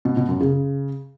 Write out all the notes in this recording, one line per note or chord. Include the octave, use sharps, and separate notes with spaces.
B2
B2
F#2
C#3